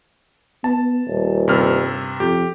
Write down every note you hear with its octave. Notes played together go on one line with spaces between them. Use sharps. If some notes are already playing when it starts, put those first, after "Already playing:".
B3 A5
D#1
G2 C3 F6
F2 G4